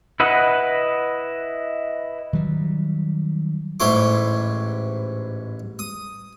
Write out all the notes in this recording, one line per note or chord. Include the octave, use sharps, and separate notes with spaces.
E4 B4 D#5 F#5
D#3 F#3 G3
A1 G#2 E4 C#5 C6 D6
D#6